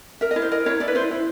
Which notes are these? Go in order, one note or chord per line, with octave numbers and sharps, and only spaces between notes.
A#4 E5
D#5
E4
C5
A#4 D#5
E4 C#5
E4 D5
B4
E4 C5
E4